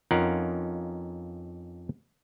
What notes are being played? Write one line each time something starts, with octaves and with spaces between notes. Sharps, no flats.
F2 C#4 D#4 F4 A#4 F#5